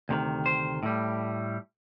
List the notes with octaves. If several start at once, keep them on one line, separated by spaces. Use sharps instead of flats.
D2 C3 D#3
C5
A2 G3